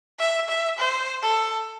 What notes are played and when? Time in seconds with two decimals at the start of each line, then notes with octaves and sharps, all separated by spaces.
0.19 E5
0.48 E5
0.78 C5
1.22 A4